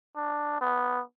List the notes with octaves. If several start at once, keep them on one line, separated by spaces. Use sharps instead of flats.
D4
B3